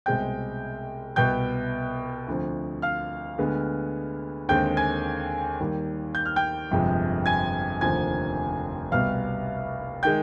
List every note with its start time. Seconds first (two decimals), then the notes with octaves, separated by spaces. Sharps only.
0.06 C2 B2 G#3 C4 G5 G6
1.16 C2 B2 B3 G5 G6
2.27 D2 D3 F3 C4
2.82 F5 F6
3.38 D2 D3 G#3 B3
4.49 D#2 D3 G#3 C4 G5 G6
4.77 G#5 G#6
5.60 D#2 D#3 G3
6.15 G6
6.25 F6
6.36 G5 G6
6.71 G1 F2 C3 F3 G#3
7.26 G#5 G#6
7.81 F1 D#2 D3 F3 C4 G#5 G#6
8.92 C2 B2 G3 B3 F5 F6
10.03 D#3 G#3 G5 G6